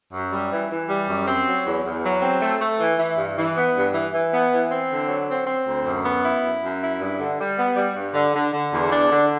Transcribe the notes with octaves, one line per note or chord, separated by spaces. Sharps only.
F#2
G3
E3
E3
G3
F#2
C4
F#3
E2
E2
F#3
C4
A3
A3
E3
E3
G2
E3
B3
G2
E3
E3
B3
E3
C4
D3
F#3
C4
C4
D2
F#2
B3
E4
F#2
F#2
E4
G2
D3
G3
B3
G3
G2
D3
D3
D3
E2
D4
D3